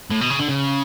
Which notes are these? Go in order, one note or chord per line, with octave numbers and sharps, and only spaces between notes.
A2
B2
C#3
D3
C#3